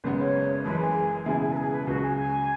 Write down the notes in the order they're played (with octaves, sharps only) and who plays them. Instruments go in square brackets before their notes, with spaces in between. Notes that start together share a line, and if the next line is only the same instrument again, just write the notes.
[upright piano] G#1 F#2 C#3 G#3 B3
[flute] C#5
[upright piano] F#1 F#2 E3 G#3 [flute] B4
[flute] G#4
[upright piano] E1 E2 C#3 F#3 E4 [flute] G#4
[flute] G#4
B4
G#4
B4
[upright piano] C#2 C#3 F#3 [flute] F#4
[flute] G#4
G#5